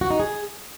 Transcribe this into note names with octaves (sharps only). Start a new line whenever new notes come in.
F#4
D#4
G#4